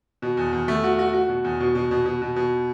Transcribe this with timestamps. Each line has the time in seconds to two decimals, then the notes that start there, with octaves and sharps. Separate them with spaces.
0.22 B2
0.37 E2
0.53 E2
0.68 A3
0.84 F#4
0.99 F#4
1.13 F#4
1.29 B2
1.44 E2
1.60 B2
1.75 B2
1.91 B2
2.06 B2
2.22 B2
2.36 B2